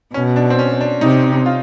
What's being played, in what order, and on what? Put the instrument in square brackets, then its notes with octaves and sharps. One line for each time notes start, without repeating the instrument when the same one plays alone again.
[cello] B2 [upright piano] C#4
[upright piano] D4
C4
C#4
D4
[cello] C3 [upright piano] D#4
[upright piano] F4